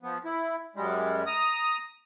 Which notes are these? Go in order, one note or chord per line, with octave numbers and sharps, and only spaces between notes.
F3 B3
E4
F#2 G3 G#3
A#5 D#6